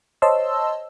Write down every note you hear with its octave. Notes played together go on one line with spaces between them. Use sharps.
C5 C#5 D#5 A5 C6 E6